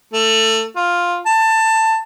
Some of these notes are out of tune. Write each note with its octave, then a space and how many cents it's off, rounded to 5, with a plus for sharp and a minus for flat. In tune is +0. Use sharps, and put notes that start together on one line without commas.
A3 +20
F4 +5
A5 +15